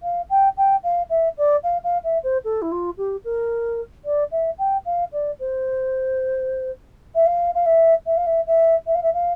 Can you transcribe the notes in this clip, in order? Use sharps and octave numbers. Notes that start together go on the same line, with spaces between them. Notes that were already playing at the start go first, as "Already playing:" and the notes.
F5
G5
G5
F5
E5
D5
F5
F5
E5
C5
A4
E4
F4
G4
A#4
D5
E5
G5
F5
D5
C5
E5
F5
F5
E5
E5
F5
E5
E5
E5
F5
E5
F5